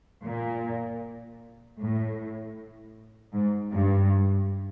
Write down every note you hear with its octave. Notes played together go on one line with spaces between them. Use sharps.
A#2
A2
G#2
G2